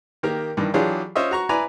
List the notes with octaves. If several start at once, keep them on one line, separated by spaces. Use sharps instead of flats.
D#3 A#3 G4 A#4
G2 D#3 E3
E3 F#3 D4 F4 G4 G#4
C#4 F4 C5 C#5 D#5 E5
F#4 A#5 C#6
E4 B4 D5 G#5 A#5